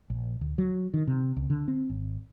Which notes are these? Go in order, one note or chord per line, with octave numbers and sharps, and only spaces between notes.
A#1
D2
F#3
D#3
C3
C#2
D3
C4
G#1